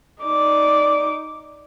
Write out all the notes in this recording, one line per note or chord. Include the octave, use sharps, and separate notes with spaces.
D#4 D5 D6